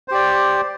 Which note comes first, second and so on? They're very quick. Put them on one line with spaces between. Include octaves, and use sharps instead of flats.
C5 G4 D5